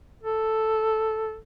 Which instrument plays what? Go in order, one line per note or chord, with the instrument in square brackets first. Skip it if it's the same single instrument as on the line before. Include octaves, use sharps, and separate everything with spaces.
[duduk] A4